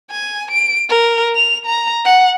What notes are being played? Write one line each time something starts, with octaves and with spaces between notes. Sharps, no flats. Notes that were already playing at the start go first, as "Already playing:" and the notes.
G#5
D7
A#4
F7
A#5
F#5